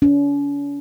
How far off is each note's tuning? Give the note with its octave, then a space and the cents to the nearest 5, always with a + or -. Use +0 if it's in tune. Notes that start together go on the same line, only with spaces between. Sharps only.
C#4 +45